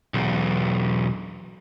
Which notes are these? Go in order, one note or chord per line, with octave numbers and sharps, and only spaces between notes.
B1 E2